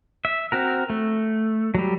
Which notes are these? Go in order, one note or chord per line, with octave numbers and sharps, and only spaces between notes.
E5
C4 F#4 A#4
A3
F#3 G3